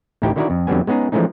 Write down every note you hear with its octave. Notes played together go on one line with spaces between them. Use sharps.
A1 D2 D#4 E4 G4 G5
D3 D#3 E4 F#4 A#4 D5
F2
F2 D3 F#3 G3 B3 G#5
G#3 B3 C#4 D#4 G#4
E3 F3 G#3 A3 C#4 D#4